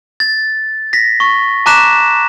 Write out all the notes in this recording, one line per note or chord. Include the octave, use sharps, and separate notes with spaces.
A6
A#6 B6
C#6
A5 A#5 D6 F#6 B6 E7